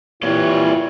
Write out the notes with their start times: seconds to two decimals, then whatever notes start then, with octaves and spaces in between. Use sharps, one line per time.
0.23 E3 G3 A#3 C4 E4 F4 C#5